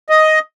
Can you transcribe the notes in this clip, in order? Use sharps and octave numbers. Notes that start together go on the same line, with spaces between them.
D#5